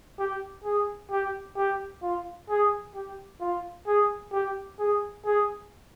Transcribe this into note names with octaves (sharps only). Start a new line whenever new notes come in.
G4
G#4
G4
G4
F4
G#4
G4
F4
G#4
G4
G#4
G#4